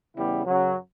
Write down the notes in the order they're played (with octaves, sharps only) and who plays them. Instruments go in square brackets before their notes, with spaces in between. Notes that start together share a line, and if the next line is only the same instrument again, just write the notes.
[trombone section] E2 C#3 G3 B3 E4
F#2 C#3 F#3